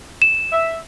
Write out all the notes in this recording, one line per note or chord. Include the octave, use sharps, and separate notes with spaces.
E7
E5